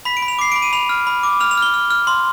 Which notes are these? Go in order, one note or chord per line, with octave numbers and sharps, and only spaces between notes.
B5 B6
D7
B5
F7
D6 C7
B5 D7
D#7
B5 F7
F6
B5
D6
F6 F7
F7
F6 G7
F6
F6
C6